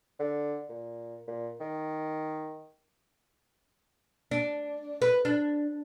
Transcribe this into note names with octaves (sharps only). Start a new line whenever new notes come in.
D3
A#2
A#2
D#3
D4
B4
D4